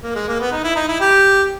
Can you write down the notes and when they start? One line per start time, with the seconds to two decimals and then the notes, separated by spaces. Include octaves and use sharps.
0.03 A#3
0.15 G#3
0.28 A#3
0.40 B3
0.52 D#4
0.64 E4
0.75 D#4
0.88 E4
1.00 G4